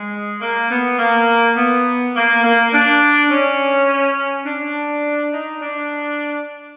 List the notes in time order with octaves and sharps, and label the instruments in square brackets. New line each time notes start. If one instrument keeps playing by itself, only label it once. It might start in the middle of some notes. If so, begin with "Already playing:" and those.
Already playing: [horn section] G#3
A#3
B3
A#3
B3
A#3
A#3
D4
C#4
D4
D#4
D4